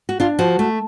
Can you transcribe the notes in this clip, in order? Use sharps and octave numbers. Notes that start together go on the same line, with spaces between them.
F#4
D4 F4
F3 F#4
A3